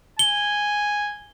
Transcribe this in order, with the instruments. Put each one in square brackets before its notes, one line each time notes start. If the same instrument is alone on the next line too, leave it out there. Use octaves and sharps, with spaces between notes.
[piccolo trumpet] G#5 [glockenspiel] G7